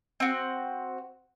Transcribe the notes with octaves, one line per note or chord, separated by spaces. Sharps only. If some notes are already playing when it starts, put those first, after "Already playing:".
C4 F#4